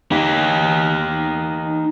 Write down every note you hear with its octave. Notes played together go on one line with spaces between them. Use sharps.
D#4 G4